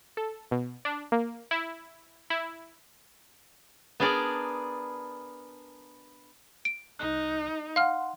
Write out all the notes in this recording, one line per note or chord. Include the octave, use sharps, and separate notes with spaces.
A4
B2
D4
A#3
E4
E4
B3 D4 G#4 A#4 D5
D7
C2 D#4 F#6
F5 F#5 C6 F6